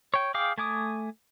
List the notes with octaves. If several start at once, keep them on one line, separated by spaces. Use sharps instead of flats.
C#5 G5
G#4 F5 G5 D6
A3 G#5 D6 D#6